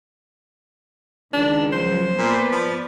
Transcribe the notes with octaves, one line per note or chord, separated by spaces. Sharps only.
C#2 D#3 D4
F3 F#3 C5
A#2 B3 B4 D5
F3